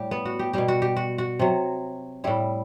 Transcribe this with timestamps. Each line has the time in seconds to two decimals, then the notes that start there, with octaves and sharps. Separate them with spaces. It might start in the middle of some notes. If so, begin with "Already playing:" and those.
Already playing: A2 G3 G4
0.11 B3
0.25 F#4
0.39 G4
0.53 B2 G3 G4
0.68 F#4
0.82 G4
0.96 F#4
1.18 F#4
1.39 C3 F#3
2.24 A2 G3 E4